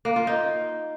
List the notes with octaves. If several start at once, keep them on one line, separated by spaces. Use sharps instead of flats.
A#3
F4
D#4